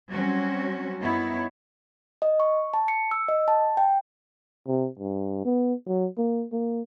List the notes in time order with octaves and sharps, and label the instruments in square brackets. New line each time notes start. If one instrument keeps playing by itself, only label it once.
[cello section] F#3 G3 C4 C#4 F#4
F#2 B3 D#4 E4 C#5
[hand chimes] D#5
C#6
A5
C#7
E6
D#5
A5
G5
[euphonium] C3
G2
B3
F#3
A#3
A#3